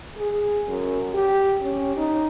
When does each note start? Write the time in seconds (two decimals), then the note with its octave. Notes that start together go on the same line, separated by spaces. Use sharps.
0.18 G#4
0.68 F#2
1.14 G4
1.61 C#4
1.97 D#4